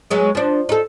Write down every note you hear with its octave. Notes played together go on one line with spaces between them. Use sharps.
F#3 G#3 B3
F3 D4
D#4 A4